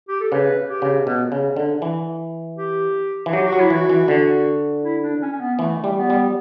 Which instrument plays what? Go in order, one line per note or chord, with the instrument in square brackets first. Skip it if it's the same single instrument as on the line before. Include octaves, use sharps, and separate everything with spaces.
[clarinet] G4
A4
[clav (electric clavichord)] C#3 [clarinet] B4
[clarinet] G4
[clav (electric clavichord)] C#3
B2
C#3
D3
E3
[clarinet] G4
[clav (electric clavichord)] E3
[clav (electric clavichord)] F#3 [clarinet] G4
[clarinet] F#4
[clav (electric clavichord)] F#3
[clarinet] E4
[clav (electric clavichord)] E3 [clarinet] F#4
[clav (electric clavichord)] E3
D3
[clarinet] E4
D4
C#4
C#4
B3
[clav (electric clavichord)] E3 [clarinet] A3
[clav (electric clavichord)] G3
[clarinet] B3
[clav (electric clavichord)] G3